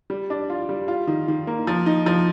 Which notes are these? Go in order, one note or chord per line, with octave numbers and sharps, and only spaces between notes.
G3
D4
F4
G3
F4
D#3
D#3
A#3
F3
D#4
F3